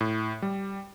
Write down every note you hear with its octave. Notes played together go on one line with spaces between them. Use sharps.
A2
G3